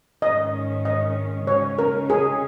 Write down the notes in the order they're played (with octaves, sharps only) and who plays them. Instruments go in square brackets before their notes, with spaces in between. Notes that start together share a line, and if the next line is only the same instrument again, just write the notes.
[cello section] G#2 D#3 G#3 C#4 [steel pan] D#5
[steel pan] D#5
[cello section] C#3 G#3 C#4 [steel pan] C#5
[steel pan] A#4
G#4